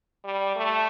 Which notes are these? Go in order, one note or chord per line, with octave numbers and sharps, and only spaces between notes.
G3
A3